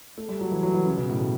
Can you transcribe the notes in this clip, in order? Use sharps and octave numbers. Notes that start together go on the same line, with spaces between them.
A3
G3
F#3
E3
F#3
E3
C#3
B2
A2
B2